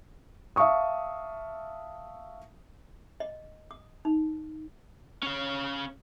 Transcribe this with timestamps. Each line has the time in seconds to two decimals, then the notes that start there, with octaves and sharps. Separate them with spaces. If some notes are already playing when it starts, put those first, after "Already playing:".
0.56 E5 F5 A5 C#6 D#6
3.20 D#5
3.71 D#6
4.05 D#4
5.23 C#4 F5